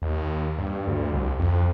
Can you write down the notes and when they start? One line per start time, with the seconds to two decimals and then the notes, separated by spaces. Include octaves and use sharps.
0.02 D#2
0.58 G2
0.87 D2
1.12 C2
1.39 F2